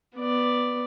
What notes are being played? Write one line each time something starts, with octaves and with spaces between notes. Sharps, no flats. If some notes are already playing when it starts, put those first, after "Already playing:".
B3 D5